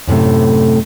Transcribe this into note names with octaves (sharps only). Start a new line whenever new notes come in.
F#2 A2 C3 A3